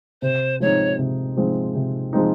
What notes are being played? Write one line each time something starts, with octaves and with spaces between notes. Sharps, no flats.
C3 C5
F3 G#3 C4 D#4 C#5
C3
F3 G#3 C4 D#4
C3
F3 G#3 C4 D#4